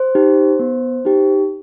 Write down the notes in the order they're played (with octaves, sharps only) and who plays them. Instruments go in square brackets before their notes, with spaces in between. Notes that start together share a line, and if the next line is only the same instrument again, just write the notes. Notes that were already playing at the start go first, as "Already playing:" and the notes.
Already playing: [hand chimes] C5
D#4 G4
B3
D#4 G4